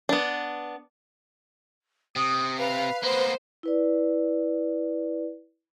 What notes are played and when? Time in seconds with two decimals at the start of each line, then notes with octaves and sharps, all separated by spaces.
0.09 B3 D4
2.16 C3 D#6
2.59 B4 F5
3.03 A#3 B3 C5
3.63 E4 B4 D5